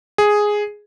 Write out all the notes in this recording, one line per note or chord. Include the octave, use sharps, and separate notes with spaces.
G#4